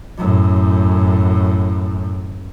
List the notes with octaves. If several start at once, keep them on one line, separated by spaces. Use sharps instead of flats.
F#2 A2